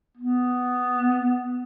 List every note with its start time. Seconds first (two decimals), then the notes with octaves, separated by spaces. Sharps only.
0.17 B3